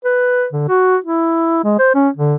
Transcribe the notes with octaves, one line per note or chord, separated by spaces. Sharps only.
B4
D3
F#4
E4
G#3
C5
C#4
D3